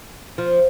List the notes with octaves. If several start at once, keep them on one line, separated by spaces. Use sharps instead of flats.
F3